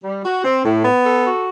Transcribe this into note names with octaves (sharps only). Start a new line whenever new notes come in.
G3
F#4
C4
A2
B3
A4
F#4